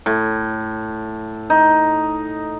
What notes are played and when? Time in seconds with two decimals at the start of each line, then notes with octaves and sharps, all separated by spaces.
0.06 A2
1.50 D#4